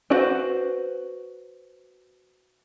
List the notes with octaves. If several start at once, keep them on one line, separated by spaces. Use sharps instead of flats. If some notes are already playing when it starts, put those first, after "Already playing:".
D4 F#4 B4 C5 F#5